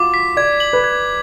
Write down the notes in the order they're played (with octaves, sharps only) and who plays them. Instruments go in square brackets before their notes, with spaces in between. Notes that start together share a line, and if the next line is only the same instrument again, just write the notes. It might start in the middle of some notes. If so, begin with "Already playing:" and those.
Already playing: [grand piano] F4 F#4 [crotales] D6
[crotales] B6
[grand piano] D5 [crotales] G#6
[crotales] F#7
[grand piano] B4
[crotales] G#6